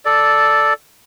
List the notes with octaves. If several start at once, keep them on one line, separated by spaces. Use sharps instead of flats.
A4 D5